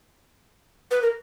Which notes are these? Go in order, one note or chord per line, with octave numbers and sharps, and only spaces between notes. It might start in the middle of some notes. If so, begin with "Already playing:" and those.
B4
A#4